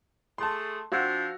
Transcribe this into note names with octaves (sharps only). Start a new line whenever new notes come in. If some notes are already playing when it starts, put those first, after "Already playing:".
A3 G#4 A5 C6
F3 C4 D4 F#4 F5 E6